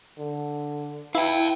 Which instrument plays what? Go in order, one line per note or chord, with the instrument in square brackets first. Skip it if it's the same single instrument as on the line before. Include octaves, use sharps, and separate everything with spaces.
[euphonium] D3
[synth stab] E4 [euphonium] B4 [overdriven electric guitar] F5 G5